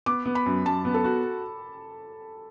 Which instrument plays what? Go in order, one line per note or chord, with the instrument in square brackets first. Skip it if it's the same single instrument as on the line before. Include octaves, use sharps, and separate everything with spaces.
[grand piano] B3 [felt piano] D6
[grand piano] B3
[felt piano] B5
[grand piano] F#2
[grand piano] F#2 [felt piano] A5
[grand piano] B3
[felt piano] A4
[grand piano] F#4